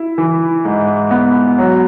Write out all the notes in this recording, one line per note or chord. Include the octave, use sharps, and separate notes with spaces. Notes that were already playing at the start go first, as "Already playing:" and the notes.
Already playing: E4
E3
G#2
B3
F#3